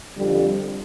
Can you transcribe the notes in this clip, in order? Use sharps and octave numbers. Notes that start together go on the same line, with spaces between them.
F2 D3 G3